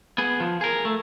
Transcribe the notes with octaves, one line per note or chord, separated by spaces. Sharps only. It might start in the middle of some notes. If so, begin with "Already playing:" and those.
B3 G#4
F3
G#4 A#4
A3